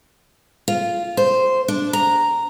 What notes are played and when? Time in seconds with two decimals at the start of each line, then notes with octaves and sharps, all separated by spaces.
0.68 F4
1.17 C5
1.68 D4
1.93 A#5